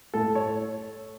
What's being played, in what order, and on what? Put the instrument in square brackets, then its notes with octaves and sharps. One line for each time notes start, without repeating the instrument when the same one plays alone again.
[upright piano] A2 A4
C#5